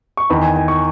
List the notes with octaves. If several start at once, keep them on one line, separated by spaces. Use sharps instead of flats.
C#6
E2 D#3 B5
G#5
G#5
C#6